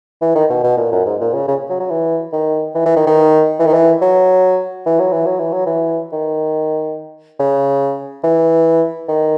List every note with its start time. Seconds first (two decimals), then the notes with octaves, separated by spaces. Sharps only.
0.22 E3
0.35 D#3
0.50 B2
0.64 B2
0.77 A#2
0.92 F#2
1.06 G#2
1.21 A#2
1.34 C#3
1.48 C#3
1.70 F#3
1.80 F#3
1.91 E3
2.33 D#3
2.75 E3
2.86 E3
2.96 D#3
3.07 D#3
3.59 E3
3.66 D#3
3.73 E3
4.01 F#3
4.86 E3
4.99 F#3
5.12 E3
5.26 F#3
5.39 E3
5.53 F#3
5.66 E3
6.13 D#3
7.39 C#3
8.24 E3
9.08 D#3